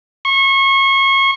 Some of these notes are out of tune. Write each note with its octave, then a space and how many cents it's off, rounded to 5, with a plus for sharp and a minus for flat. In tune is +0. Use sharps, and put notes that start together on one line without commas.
C#6 -30